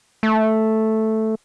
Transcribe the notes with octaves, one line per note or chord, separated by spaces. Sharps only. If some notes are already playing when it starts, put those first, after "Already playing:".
A3